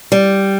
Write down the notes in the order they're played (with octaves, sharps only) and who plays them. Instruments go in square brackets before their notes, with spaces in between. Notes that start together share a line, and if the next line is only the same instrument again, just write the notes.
[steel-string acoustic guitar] G3